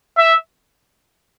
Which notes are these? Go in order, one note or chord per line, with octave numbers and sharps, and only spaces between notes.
E5